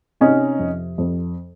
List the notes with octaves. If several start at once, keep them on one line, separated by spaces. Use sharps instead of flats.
C3 C#4 D#4
F2
F2